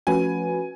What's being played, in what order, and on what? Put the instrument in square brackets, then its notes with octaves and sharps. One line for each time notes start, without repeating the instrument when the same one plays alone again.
[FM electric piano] F3 A3 C#4 F#4 B4 [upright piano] G#5